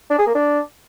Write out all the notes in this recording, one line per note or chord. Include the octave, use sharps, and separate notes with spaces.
D4
G#4
A#3
D4